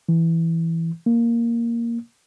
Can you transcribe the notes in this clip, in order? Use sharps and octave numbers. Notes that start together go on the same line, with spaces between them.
E3
A#3